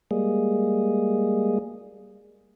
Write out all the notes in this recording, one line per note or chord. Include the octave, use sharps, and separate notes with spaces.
G3 G#3 A#3 G#4